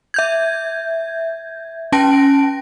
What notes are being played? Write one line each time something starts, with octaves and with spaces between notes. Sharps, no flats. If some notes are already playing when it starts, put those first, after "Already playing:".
E5 G6 G#6
C#4 G5 A5 A#6 D7